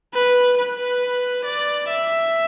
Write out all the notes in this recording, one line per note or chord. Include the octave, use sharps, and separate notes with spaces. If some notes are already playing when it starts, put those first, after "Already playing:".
B4
B4
D5
E5